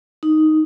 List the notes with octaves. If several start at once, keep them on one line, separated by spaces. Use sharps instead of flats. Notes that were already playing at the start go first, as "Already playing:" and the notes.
D#4